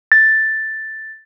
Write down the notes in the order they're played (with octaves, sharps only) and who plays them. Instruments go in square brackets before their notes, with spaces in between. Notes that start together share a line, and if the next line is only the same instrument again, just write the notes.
[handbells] A6